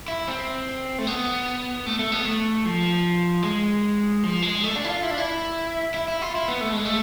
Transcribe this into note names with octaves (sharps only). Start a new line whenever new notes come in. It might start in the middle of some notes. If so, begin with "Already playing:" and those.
E4
C4
A3
B3
A3
A3
B3
A3
F3
G#3
F3
G#3
A3
D4
E4
F4
E4
D4
E4
E4
E4
F4
E4
B3
A3
G#3
A3